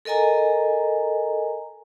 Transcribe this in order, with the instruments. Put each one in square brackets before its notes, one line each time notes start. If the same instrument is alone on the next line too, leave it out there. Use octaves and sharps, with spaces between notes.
[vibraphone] A4 A#4 D#5 G#5 A#5